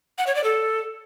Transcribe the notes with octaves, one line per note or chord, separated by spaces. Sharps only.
F#5
C#5
D5
A4